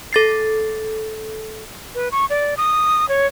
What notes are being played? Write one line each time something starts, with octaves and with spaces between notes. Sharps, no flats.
A4 A6 C7
B4
C#6
D5
D#6
C#5